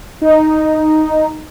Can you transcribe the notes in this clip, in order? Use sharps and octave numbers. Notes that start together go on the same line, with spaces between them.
D#4